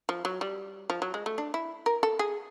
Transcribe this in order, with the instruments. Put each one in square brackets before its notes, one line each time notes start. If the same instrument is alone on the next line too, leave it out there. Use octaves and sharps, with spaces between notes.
[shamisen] F3
F#3
G3
F3
F#3
G#3
A3
D4
E4
A#4
A4
G#4